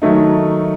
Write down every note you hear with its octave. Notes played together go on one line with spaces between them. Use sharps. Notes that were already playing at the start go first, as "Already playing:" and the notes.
D#3 F#3 A3 D#4